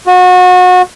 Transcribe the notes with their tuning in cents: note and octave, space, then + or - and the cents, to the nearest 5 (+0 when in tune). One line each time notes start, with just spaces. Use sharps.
F#4 -30